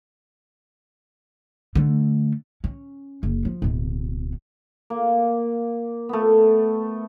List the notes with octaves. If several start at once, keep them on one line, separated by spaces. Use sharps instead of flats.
D3 A3
C#4
F#1
F3
D1 B2
A#3
A3 B3